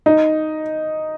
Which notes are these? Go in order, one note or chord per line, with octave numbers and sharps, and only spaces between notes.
D#4